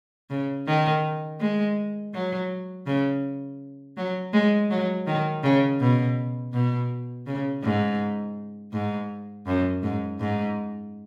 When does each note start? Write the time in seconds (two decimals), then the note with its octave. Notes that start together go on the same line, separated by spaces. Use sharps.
0.30 C#3
0.67 D#3
1.40 G#3
2.14 F#3
2.87 C#3
3.97 F#3
4.33 G#3
4.70 F#3
5.07 D#3
5.44 C#3
5.81 B2
6.54 B2
7.27 C#3
7.63 G#2
8.73 G#2
9.47 F#2
9.83 G#2
10.20 G#2